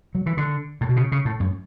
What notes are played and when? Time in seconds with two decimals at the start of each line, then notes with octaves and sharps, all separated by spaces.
0.15 F#3
0.26 E3
0.37 D3
0.81 A2
0.89 B2
0.96 C#3
1.12 C#3
1.25 A2
1.40 F#2